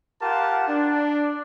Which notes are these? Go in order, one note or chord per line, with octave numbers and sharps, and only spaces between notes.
F4 G4 A#4 F#5 A5
D4